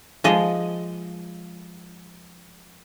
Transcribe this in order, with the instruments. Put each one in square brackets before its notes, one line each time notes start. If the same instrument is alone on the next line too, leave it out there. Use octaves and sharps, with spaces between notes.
[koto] F3 G#3 D#5